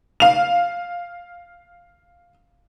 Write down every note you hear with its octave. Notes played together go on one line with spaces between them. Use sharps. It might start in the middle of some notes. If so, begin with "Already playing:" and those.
F5 F7